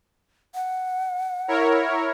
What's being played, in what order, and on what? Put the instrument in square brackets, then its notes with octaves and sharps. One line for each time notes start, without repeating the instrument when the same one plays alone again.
[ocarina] F#5
[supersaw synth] E4 A#4 C#5